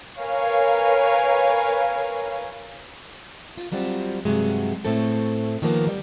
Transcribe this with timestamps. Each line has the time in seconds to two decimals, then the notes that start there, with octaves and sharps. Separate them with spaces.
0.19 A#4 B4 C#5 F5 G#5
3.58 F4
3.72 F#3 G3 C4 F4
4.25 G2 C3 F#3 G#3
4.85 A2 A3 C4 A4
5.62 D#3 F3 A#3 B3
5.87 G3